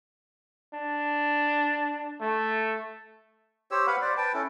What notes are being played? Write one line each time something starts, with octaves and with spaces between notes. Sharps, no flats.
D4
A3
G4 C5 C#5 E6
B4 F5 F#5 B5
C5 D5
B4 G5 A5
C#4 E4 A4